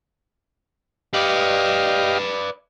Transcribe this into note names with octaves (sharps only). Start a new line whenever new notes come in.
G4 B4 D5 D#5 F5